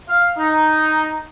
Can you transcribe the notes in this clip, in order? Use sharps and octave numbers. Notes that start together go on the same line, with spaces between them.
F5
D#4